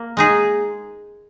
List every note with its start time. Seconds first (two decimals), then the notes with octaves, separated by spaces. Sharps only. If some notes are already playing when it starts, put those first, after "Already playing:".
Already playing: A#3
0.17 G#3 D#4 G#4